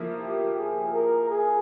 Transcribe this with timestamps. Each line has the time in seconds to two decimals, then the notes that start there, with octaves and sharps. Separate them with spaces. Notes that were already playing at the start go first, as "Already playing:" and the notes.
Already playing: F3 A#3 E4
0.20 G4
0.57 G#4
0.93 A#4
1.30 G#4